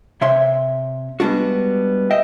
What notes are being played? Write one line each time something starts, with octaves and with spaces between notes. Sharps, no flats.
C3 C#5 E5 C6
G3 G#3 B3 D4 F#4
D#5 E5 G5